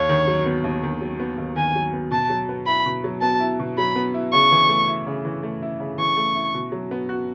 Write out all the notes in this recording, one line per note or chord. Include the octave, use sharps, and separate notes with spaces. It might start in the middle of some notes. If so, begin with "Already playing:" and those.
Already playing: D#2 C#5
D#3
F#3
B3
D#2
D#3
F#3
B3
D#2
D#3 G#5
F#3
B3
B2 A5
F#3
B3
E4 B5
B2
F#3
B3 A5
E4
B2
F#3 B5
B3
E4
C#3 C#6
E3
A3
E4
C#3
E3
A3
E4
C#3
E3 C#6
A3
E4
B2
F#3
B3
F#4